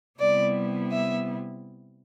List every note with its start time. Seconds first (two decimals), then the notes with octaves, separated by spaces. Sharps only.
0.19 C3 G3 B3 E4 D5
0.92 E5